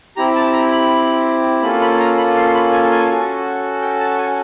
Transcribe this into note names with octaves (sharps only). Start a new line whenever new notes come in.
C4 E4 G4 A#5
A5
A#5
B5
A#3 C#4 F4 A4 B5
B5
A#5
B5
C6
B5
G#5
G#5
C#4 F#4 A4
G5
A5
G#5